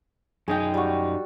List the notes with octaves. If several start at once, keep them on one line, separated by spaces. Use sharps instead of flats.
F#2 D#4 G#4 G5
G3 F#4